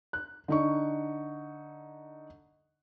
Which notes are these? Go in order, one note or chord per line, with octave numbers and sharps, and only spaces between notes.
F#6
D3 D#4 C#6